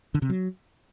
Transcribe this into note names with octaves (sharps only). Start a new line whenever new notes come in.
D3
C3
F#3